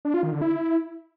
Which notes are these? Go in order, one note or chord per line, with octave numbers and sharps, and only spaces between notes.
D4
F4
D#3
D3
E4